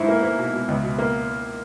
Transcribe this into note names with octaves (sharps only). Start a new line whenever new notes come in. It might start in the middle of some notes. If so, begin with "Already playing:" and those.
Already playing: G#2 E4
A#3
A#3
B2
B2
C#2
B2
A#3